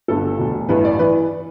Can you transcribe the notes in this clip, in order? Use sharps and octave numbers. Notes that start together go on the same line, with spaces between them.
G1 G2 D3 A4
E1 D2 D3
A1 G2 E3 B4
D5
E3 B4